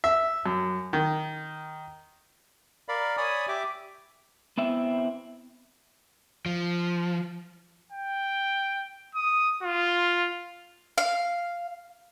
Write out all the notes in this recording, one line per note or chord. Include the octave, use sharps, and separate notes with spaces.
E5
F#2
D#3
A#4 D5 F5 B5
C#5 D5 G#5 B5 D#6
G4 E5 D6
B3 C4 E4 E5
F3
G5
D#6
F4
F5